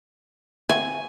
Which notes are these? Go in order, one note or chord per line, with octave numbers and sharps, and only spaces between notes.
C4 F#4 E5 G#5